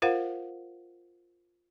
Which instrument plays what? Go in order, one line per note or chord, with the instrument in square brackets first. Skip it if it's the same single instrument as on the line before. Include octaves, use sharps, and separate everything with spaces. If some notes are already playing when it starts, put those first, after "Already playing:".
[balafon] F4 A#4 C5 F5 F#5